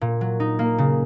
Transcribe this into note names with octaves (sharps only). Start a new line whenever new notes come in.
A#2
F#3
D#4
A#3
C#3